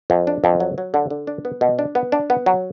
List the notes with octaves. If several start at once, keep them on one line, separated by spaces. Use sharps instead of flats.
F2
D4
F2
F#3
F#3
D3
D3
D4
B3
B2
D4
B3
D4
B3
F#3